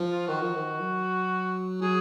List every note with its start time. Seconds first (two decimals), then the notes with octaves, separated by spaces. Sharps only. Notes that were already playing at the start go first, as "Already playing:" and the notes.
Already playing: F3
0.11 F4
0.27 D#3 F#4
0.41 F3
0.55 D#3
0.80 F#3
1.82 F#3 G#4